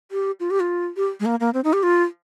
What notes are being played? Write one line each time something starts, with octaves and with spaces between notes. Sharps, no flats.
G4
F4
G4
F4
G4
G#3
A#3
A#3
C4
D#4
G4
F4